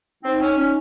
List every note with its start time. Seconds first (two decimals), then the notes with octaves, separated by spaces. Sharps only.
0.24 C4 D#4
0.41 C#4
0.57 C#4